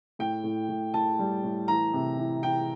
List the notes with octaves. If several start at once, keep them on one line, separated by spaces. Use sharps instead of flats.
A2 G5
A2
A2
A2 A5
G3
A2
E3 A#5
C3
E3
E3 G5